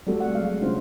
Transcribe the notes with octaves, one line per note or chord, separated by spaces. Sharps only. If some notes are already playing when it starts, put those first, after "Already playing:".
G3 A3 C4 F#4 A4
F#5
F#3 G#3 F5
A3
C3 C#4 D4 F4 C5